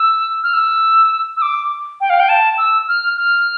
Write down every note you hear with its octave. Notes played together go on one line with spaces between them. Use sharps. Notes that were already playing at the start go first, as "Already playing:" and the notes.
Already playing: E6
F6
E6
E6
D6
G5
F5
G5
A5
E6
F6
F6